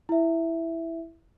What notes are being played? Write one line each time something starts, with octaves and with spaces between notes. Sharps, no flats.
E4 E5